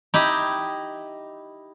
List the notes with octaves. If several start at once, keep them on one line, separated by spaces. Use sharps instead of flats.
D#4 E4 G4